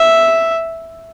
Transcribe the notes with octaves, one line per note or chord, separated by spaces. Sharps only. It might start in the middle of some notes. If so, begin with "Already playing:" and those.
Already playing: E5